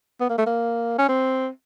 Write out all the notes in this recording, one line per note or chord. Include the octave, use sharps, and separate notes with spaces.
B3
A#3
A3
A#3
C#4
C4